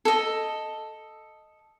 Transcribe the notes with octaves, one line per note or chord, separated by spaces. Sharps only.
A4 D#5